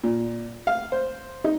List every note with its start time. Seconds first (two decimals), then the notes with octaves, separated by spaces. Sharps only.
0.04 A#2
0.67 F5
0.92 C5
1.44 D#4